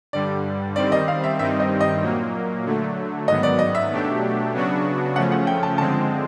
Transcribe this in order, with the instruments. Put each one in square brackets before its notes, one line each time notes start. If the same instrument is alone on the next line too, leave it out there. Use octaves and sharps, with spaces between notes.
[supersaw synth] G2 D3 G3 [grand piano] D5
[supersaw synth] D#3 G3 C4 [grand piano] D5
[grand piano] D#5
F5
E5
[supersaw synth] G2 D#3 G3 C4 D#4 [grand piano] E5
[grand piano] D#5
D#5
[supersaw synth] A#2 F#3 A#3
D3 F#3 A3
[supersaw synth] G#2 D#3 F#3 B3 [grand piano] D#5
[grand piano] D5
D#5
E5
[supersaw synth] B2 F#3 A3 D4 G4
C#3 F#3 B3 D4 F#4
[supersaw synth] C#3 F3 A3 C#4 [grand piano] F#5
[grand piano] F#5
G5
A5
[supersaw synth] D3 F3 G#3 C4 [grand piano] A5